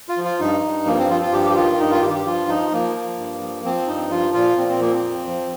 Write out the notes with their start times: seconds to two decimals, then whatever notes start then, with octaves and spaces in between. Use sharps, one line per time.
0.09 F4
0.17 F3
0.24 F4
0.40 G2 D#4
0.64 G2
0.86 F3 A#3
0.98 C4
1.10 F3 F4
1.22 F4
1.32 G2 G4
1.50 G4
1.55 D#3 F4
1.79 G2 D#4
1.91 F4
2.02 G2 G4
2.14 G4
2.26 F3 F4
2.48 F3 D#4
2.72 F3 A#3
2.95 F3
3.18 G2
3.41 F3
3.64 F3 C4
3.87 G2 D#4
4.10 F3 F4
4.34 A#2 F4
4.57 A#2 C4
4.69 C4
4.81 F3 A#3
4.92 C4
5.04 F2
5.27 F3